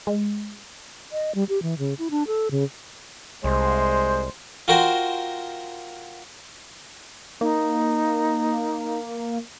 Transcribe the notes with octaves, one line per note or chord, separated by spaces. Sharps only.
G#3
D#5
G3
G4
E3
C#3
E4
D4
A4
C#3
C2 G#3 C5
F4 F#4 A#4 C5 G5
A#3 D#4